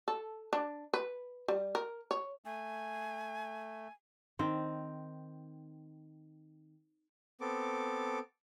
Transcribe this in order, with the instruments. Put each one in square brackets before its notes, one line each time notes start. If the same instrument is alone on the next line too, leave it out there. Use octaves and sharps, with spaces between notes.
[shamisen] A4
D4
B4
G3
A#4
C#5
[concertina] A3 [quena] G#5
[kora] D#3 C4
[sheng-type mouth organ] B3 C4 A4 D6